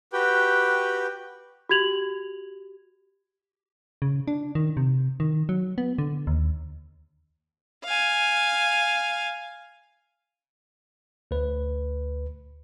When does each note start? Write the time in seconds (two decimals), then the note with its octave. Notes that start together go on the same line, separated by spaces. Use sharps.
0.13 F#4 G4 B4 G5
1.69 F#4 G4 G#6 F7 F#7
4.02 C#3
4.28 D4
4.55 D#3
4.77 C3
5.20 D#3
5.49 F#3
5.78 B3
5.98 D3
6.27 D#2
7.84 F5 G#5
11.31 D2 B4